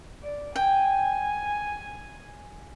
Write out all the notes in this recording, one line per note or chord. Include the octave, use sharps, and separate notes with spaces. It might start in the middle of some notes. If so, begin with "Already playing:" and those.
D5
G5 G#5